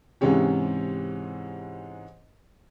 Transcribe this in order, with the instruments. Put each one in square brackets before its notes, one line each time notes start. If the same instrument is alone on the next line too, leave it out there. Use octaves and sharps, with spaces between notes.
[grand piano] G#2 C3 E3 G#3 C#4 G4